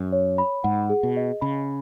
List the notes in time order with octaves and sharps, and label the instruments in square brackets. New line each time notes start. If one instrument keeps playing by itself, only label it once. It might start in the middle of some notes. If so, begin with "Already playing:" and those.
Already playing: [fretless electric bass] F#2
[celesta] C#5
B5
[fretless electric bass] G#2 [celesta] F#5
[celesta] G#4
[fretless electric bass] B2
[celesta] D#5
[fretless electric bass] C#3 [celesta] B5